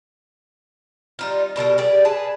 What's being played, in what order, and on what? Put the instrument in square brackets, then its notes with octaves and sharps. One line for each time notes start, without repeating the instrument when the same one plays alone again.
[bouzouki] G3 D#4 F4
B2 G3 A4 A#4
G4 G#4 D5
G#4 B4 A5